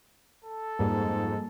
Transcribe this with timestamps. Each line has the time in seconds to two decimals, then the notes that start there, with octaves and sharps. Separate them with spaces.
0.44 A4
0.79 F2 G#2 G3 A#3